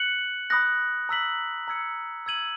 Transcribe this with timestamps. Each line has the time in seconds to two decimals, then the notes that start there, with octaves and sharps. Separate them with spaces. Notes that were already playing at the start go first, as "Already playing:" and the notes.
Already playing: F#6 C#7 F#7
0.50 B5 D#6 F#6 A#6
1.09 A#5 E6 B6 F#7
1.68 A#5 E6 G#6 C#7
2.26 E6 G#6 D#7 F#7